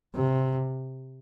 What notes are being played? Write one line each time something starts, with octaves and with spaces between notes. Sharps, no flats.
C3